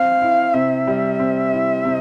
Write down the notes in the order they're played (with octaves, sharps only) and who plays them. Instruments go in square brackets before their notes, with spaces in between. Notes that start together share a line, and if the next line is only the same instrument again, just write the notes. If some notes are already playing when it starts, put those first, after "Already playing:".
Already playing: [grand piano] C4 [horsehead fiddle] F5
[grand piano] E4
[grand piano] C3 [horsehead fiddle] E5
[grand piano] G3
C4
E4
C3